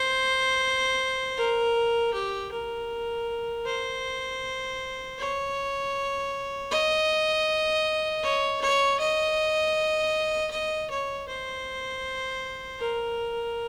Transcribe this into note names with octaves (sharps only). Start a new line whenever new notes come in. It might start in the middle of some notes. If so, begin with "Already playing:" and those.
Already playing: C5
A#4
G4
A#4
C5
C#5
D#5
C#5
C#5
D#5
D#5
C#5
C5
A#4